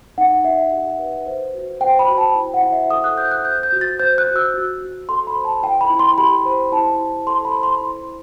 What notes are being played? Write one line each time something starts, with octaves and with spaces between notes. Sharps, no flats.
D#4 F#5
D#4 E5
G4
B4
C5
F#4
C5 G5
B5
F#4
A5
E4
F#5
E4
E5
A4 D#6
F#6
C5 G6
F#6
C5 G6
G6
F#4
A6
C5 G6
F#6
F#4
E6
F#4
F#4
A4 C6
B5
C5
A5
E4 G5
B5
E4
C6
G4 B5
C5
E4 A5
E4
A4 C6
B5
C5
C6
E4